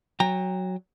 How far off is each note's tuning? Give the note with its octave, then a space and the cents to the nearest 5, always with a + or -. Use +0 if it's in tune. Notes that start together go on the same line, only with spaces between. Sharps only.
F#3 +0 G5 +35 A#5 +0